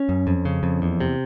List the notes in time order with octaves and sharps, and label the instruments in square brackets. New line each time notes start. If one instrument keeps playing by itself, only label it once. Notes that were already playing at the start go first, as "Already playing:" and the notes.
Already playing: [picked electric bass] C#4
F#2
F2
C#3
F2
E2
C3